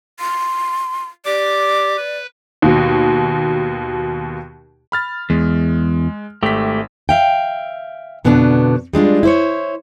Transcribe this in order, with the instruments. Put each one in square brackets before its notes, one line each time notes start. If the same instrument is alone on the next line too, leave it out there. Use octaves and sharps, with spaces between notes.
[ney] C6
[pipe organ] G4 D6 [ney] D5
[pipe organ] B4
[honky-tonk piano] D#2 B2
[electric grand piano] B5 F6 A6
[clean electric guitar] E2 [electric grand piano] G#3
[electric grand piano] G#1 B6 [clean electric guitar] A3 G4
[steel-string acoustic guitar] E5 F5 G5
F2 B2 D3 B3 C#4 D4
G3 G#3 D4 F4
E4 C5 C#5